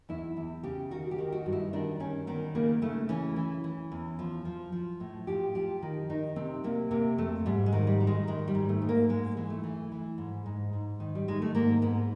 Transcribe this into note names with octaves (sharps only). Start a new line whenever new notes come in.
E2 E4
E2
C#3 G4
D#3 F#4
G4
D#3
F#4
G2
E4
D#3 D4
D#3 C#4
D#3 B3
C#3 A#3
C#3 A3
E3 C#4
E3
E3
E2
F3
F3
F3
A2
F3 G4
F3 G4
D#3
D#3 D#4
C3 C4
C3 A#3
C3 A#3
F2 A3
G#2 G3
G#3
D#3
G3
D#3
G#3
D#3 G#3
G3
G#2
A3
G#2
A#3
G#2 G#3
E3
A3
E3
E3
G#2
G#2
G#2
D#3
G3
D#3 G#3
A3
G#2 A#3
G#2 B3